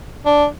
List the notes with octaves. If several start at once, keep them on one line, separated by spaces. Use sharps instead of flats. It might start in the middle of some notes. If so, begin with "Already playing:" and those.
D4